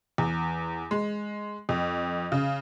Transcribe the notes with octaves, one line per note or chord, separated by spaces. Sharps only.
E2
G#3
F2
C#3